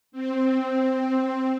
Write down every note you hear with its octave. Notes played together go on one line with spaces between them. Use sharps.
C4